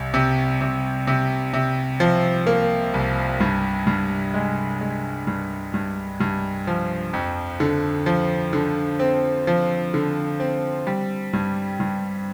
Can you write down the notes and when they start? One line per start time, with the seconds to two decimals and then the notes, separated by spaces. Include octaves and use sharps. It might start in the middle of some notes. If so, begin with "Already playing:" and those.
Already playing: C2
0.14 C3
0.61 C3
1.07 C3
1.53 C3
2.00 F3
2.47 A#3
2.94 C2
3.40 G2
3.87 G2
4.34 G#3
4.81 G#3
5.27 G2
5.74 G2
6.20 G2
6.67 F3
7.13 F2
7.60 D3
8.06 F3
8.53 D3
8.99 C4
9.47 F3
9.94 D3
10.40 C4
10.87 G3
11.33 G2
11.80 G2